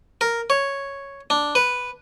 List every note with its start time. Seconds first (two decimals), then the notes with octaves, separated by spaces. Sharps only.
0.21 A#4
0.50 C#5
1.30 D4
1.55 B4